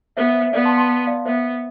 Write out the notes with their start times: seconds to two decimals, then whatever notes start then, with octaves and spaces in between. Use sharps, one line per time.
0.17 B3 C5 E5
0.29 C5 E5
0.41 C5 E5
0.53 B3 D5 F5
0.65 A5 C6
0.77 A5 C6
1.07 D5 F5
1.25 B3 C5 E5